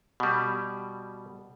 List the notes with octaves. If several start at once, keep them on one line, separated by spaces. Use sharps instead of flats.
B2 G3